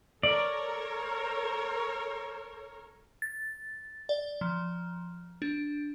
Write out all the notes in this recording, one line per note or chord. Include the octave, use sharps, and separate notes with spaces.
A4 A#4 C#5 D5
A6
D5
F3
D4